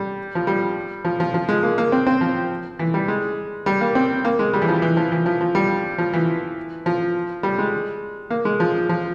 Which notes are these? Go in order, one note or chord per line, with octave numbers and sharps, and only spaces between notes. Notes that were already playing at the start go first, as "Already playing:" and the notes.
Already playing: G3
F3
G3
F3
F3
F3
G#3
A#3
A#3
C4
C4
F3
E3
G3
G#3
G3
A#3
C4
A#3
G#3
G3
E3
F3
E3
F3
E3
F3
F3
G3
F3
E3
F3
G3
G#3
A#3
G#3
F3
F3